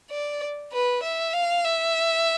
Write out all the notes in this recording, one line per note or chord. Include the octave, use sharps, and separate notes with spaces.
D5
B4
E5
F5
E5